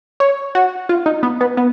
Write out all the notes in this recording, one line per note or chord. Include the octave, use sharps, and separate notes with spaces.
C#5
F#4
F4
D#4
B3
B3
B3